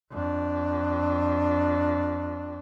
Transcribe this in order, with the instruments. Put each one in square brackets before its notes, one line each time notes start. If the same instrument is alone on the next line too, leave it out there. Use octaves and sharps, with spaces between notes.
[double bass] F2 D4